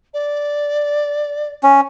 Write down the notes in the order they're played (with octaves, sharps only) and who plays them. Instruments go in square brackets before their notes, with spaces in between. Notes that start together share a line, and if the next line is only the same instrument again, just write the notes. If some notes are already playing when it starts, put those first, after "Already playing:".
[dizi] D5
[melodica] C#4